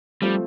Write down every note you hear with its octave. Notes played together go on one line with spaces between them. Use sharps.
F3 G3 A3 C4